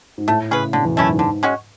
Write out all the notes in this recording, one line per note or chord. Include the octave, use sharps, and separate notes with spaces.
G#2
A2 A3
C#3 C#4 G#4 B4
B2 D3
E2
F#2 A3 C#4 E4
G#2
D3
G#3 C#4 F#4